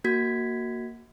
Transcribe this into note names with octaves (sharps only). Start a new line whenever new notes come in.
A#3 F#4 G#6 B6